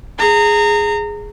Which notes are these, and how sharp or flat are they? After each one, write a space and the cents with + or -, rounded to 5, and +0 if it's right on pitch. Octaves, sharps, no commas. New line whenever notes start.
G#4 +0 A#5 -25